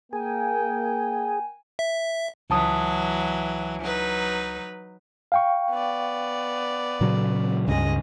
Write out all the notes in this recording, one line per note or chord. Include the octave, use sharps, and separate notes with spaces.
A#3 G#4 A#4 G5 G#5
E5
C#2 E3 F#3 A5 D#6
F#3 D#4 B4
F5 G5 C#6
B3 D5
A#2 C#3 F#3
C#2 G2 C#3 G#3 D#5